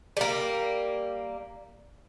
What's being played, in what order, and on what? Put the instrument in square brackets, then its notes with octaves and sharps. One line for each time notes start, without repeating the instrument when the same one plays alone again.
[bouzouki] G3 A#3